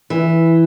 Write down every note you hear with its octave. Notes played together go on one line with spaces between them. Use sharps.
E3